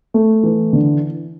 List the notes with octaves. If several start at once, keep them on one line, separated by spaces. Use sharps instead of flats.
A3
E3
D3